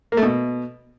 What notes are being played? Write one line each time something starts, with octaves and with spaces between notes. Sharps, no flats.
A#3
A3
B2